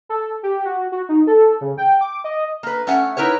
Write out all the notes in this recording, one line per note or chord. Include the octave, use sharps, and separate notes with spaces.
A4
G4
F#4
F#4
D#4
A4
C#3
G5
D6
D#5
A#3 B4
A3 C#4 E5 F#5 G#5
D#4 E4 A#4 B4 C#5